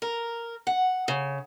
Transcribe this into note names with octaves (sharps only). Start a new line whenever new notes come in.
A#4
F#5
C#3